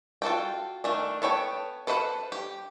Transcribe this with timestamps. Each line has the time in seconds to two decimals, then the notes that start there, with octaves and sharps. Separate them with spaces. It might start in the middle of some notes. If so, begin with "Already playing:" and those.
0.22 F4 F#4 A4 G5
0.84 D#3 A3 D4
1.22 B3 A4 C#5 G5
1.87 A4 B4 C5 E5 F#5
2.32 G4